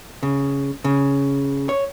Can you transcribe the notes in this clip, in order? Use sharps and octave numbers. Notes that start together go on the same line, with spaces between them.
C#3
C#3
C#5